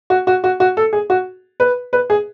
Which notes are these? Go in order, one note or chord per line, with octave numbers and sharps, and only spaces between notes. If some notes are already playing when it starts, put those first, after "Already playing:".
F#4
F#4
F#4
F#4
A4
G#4
F#4
B4
B4
G#4